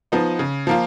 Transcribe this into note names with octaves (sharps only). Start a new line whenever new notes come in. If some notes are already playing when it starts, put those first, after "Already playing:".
F3 B3 D#4
C#3
F3 A#3 F4